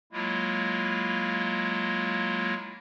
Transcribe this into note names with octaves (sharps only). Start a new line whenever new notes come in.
F#3 G#3 A#3 E4 F4